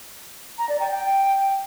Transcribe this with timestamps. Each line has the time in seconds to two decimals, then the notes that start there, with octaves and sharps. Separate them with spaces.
0.58 A#5
0.69 D5
0.80 G5
0.91 G5